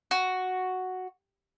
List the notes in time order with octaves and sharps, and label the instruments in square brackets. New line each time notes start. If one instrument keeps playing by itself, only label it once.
[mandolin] F#4